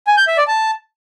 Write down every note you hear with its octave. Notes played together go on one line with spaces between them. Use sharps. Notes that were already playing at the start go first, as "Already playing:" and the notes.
G#5
G6
E5
D5
A5